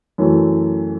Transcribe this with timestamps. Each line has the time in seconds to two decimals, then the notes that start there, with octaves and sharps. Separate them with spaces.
0.18 F#2 E3 A3